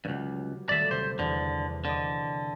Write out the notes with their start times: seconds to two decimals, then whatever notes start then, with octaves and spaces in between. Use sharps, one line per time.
0.05 C#2 G2 F#3 G3
0.69 D#1 G3 A3 D5 E5
0.91 C3 C5
1.19 E2 D3
1.85 D3 D5 D#5